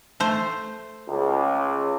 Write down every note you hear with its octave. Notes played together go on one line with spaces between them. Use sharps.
A3 C5
C#2